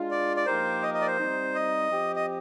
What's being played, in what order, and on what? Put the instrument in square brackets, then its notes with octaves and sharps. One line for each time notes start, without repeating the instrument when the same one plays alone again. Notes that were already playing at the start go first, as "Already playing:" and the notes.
Already playing: [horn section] G#3 D4 F4
[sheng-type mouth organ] D5
D5
[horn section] F3 A#3 D#4 G4 A#4 [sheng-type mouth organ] C5
[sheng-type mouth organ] D#5
D#5
D5
C5
[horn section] G3 C4 D#4
[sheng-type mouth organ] D#5
[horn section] F3 C4 G4
[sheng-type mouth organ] D#5